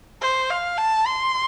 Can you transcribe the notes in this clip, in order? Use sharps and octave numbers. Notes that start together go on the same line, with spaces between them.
C5
F5
A5
C6